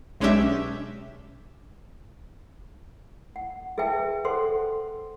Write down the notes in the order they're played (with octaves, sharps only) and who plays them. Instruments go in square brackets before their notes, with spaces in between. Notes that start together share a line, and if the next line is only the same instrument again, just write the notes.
[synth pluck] B1 G#3 C#4 D4 G4 E5
[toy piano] F#5
G#4 B4 E5 G5 A5
A4 C5 F#5 C6